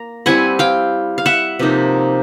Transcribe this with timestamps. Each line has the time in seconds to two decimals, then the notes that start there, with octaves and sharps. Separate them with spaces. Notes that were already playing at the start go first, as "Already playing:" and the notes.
Already playing: A#3 A#5
0.26 G3 C4 E4 F#5 G#5
0.59 F5 G5
1.18 F5
1.26 E5 F#5
1.59 C3 F3 A#3 D#4